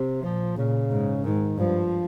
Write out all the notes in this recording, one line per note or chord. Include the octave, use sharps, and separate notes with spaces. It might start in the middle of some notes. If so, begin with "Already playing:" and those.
Already playing: C3
A#2 F3
A#2 C#3
G#2
G#2 D#3
G2 F3